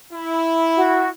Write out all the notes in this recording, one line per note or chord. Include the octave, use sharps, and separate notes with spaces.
E4
F#4